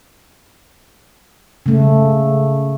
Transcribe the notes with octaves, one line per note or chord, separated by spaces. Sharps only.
C#3 A3